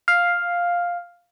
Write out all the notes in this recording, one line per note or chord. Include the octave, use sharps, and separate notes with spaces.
F5